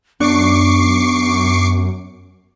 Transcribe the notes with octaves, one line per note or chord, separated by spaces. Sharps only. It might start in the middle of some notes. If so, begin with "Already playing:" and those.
F#2 B3 D4 C#6 D6 C7